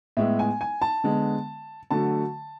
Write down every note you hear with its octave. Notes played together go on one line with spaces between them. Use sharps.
A2 G#3 B3 E5
G#5
G#5
A5
D3 G#3 B3
D3 F#3 A3 A5